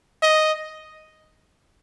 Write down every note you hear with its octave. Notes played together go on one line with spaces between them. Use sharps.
D#5